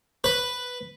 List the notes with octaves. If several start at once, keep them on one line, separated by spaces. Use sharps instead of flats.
B4